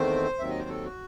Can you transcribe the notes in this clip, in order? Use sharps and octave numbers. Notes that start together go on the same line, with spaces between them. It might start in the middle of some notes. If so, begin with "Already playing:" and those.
Already playing: E2 D#3 A3 C4 C5
D#2 D#3 F#3 C4 E5
D#5
C5
A4
F#4